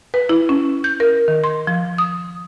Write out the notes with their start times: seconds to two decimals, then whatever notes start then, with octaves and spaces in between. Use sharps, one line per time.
0.14 B4
0.29 E4
0.49 C#4
0.84 G6
1.00 A#4
1.28 D#3
1.44 C6
1.67 F3
1.98 D#6